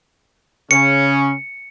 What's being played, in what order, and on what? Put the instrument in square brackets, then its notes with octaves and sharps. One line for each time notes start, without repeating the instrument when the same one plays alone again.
[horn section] C#3 C#4 [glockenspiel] C#7